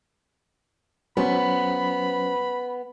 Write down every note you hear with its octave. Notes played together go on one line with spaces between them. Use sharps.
F#3 B3 C#4 C5 B5